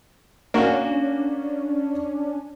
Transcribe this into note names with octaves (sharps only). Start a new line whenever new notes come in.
A#3 C#4 D4 F#4